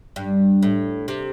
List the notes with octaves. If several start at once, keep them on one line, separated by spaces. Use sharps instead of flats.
G2
A2
C3